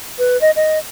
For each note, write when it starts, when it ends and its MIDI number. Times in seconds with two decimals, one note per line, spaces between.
0.19 0.40 71
0.41 0.51 75
0.56 0.78 75